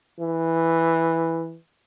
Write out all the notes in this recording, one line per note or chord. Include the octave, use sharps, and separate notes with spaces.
E3